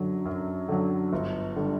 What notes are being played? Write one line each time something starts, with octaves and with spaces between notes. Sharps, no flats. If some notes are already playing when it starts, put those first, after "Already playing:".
Already playing: F#2 D3 F#3
F#2
D3 F#3
G1
D3 G3